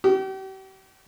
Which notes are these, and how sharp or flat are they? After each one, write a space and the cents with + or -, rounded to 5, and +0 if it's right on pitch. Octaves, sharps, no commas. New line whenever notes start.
G4 -40